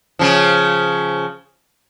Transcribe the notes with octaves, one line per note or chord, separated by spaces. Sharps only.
C#3 F3